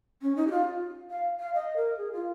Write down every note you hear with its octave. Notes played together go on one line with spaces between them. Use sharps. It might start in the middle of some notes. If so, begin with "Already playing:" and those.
C#4
D#4
G4
F4
F5
F5
D#5
A#4
G#4
F4